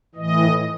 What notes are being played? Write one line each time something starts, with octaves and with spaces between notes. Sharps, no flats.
A2 E3 D#5